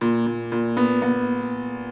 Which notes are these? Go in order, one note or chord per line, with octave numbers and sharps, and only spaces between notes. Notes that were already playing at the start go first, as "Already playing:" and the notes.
A#2
A#2
A#2
B3
B3